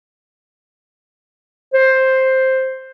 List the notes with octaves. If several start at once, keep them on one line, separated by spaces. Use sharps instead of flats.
C5